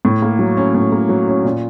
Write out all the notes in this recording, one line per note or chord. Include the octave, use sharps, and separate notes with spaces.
A2
A#3
F#3
C#4
A2
A#3
F#3
C#4
A#2